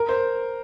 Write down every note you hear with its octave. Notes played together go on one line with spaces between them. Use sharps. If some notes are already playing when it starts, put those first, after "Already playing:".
Already playing: A#4
C5